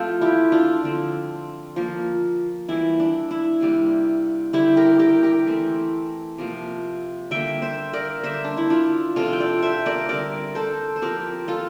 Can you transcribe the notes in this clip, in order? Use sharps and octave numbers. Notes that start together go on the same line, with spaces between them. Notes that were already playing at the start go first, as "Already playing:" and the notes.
Already playing: F3 A3 C4 F4 A4 C5
E4 G4
D4 F4
D3 F3 C4
F3 A#3
E3 G3 A#3 E4
D4
E4
C3 G3 A#3
D3 G3 C4 E4 G4
G4 A#4
G4 A#4
G4 A#4
E3 A3 C4
C3 F3 A#3
D3 G3 A#3 E5 G5
C5 E5
A#4 D5
D3 G3 A#3 C5 E5
D4
E4
D4 F4
C3 F3 C4 F4 A4
G5
D5 F5
C5 E5
A#4 D5
D3 G3 C4 A#4 D5
A4 C5
C5
F3 C4 G4 A#4
F4 A4